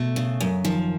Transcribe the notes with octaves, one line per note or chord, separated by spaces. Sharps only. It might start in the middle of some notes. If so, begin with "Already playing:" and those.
Already playing: B2 A3
C#3
F#2
D#3 F3